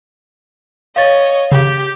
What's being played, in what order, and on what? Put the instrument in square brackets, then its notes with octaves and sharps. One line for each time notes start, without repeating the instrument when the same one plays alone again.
[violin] C#5 D#5 [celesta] F5 A6
[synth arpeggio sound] C#3 [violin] G4